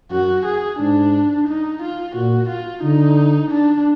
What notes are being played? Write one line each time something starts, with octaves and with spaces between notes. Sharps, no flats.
F#2 F#4
G#4
G#2 D4
D#4
F4
A#2 F#4
F4
D3 D#4
D4